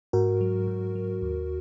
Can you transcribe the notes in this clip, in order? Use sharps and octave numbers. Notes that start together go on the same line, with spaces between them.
G#2 F#4 A#4
F#3
G#2
F#3
D#2